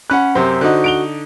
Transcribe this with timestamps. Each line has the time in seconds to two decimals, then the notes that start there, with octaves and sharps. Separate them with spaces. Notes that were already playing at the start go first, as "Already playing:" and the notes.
0.10 C#4 F#5 B5 F#6
0.35 F#2 C3 C5
0.61 D3 D#4 F#4
0.84 D7 F7 G7